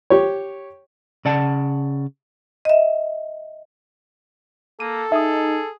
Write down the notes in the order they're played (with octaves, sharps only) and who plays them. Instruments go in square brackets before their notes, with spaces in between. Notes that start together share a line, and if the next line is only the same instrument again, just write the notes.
[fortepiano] G4 C#5
[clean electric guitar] C#3 D5 F#5 A5
[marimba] D#5 E5
[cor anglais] A#3 [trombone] A4 [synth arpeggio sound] D#7
[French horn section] D#4 [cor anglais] G#4 [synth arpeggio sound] E5 D#6